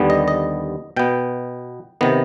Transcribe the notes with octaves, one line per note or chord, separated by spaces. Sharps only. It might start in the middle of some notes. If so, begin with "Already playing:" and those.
Already playing: D#2 D3 G3 B3
D#5
D#5
B2 B3 G5
C3 D#3 B3